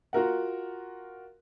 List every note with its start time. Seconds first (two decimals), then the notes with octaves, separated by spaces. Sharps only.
0.13 F4 F#4 A#4 F#5